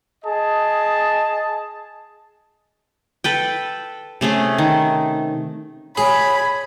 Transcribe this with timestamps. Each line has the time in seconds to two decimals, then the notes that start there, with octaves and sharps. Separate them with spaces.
0.25 G#4 D#5 A5
3.24 A4 B4 G5
4.21 C3 A3 C#4 G#4
4.58 D#3
5.97 G#4 C#5 B5